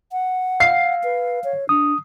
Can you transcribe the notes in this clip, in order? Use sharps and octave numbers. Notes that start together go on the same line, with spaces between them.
F#5
F5 C7
B4
C#5
D4 D#6